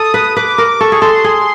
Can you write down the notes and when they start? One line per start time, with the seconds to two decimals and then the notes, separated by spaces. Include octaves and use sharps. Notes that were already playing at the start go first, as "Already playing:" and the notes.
Already playing: A4 D#6
0.14 B4
0.37 B4 D6
0.58 A#4
0.81 A4 C#6
0.92 G#4
1.02 A4 C6
1.24 G#4